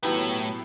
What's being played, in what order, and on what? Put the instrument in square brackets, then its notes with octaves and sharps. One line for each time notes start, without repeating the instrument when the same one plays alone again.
[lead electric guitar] A2 [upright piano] F#3 B3 E4 G4 B4